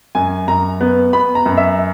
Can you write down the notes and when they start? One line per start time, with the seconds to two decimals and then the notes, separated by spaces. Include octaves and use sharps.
0.15 F#2 G#5
0.48 F#2 A#5
0.81 B3
1.13 B3 B5
1.35 A#5
1.46 F#2
1.57 E5